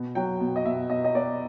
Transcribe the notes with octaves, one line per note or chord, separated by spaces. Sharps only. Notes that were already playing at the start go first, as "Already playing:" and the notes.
Already playing: B2
F#3 G5
B2
D#5
B2 E5
B2 D#5
D#5
B2 D5